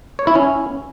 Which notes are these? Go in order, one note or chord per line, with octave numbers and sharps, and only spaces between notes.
C#5
E4
C#4